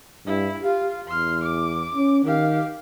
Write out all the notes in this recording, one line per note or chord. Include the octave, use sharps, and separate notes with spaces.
G2 E4
F4 G4 F5
E2 C6 F6
D6
C#4
D#3 G4 F5